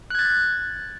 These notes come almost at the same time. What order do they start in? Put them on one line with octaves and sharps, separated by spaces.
F#6 G#6 A6